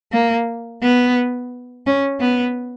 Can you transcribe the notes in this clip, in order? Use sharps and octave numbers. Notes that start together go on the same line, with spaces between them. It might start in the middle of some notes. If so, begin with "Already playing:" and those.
A#3
B3
C#4
B3